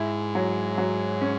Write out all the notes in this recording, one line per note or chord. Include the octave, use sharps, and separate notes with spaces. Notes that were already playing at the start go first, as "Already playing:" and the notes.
Already playing: G#2 E4
F#3
F#3
C#4